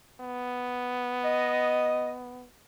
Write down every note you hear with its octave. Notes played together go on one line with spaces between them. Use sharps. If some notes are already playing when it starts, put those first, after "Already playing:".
B3
D#5